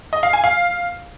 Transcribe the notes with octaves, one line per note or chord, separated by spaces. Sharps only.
D#5
F5
G#5
F5